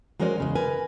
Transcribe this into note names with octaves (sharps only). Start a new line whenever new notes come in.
F#3 G#3 C#4 A#4 C5 D5
E2 C#3 G#3
A#4 B4 G#5